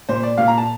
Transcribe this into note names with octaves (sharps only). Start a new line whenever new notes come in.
A#2 C5
D5
A#2 F5
A#5
A5